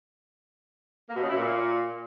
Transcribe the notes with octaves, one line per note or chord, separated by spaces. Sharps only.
A#3
B2
C#3
E4
A#2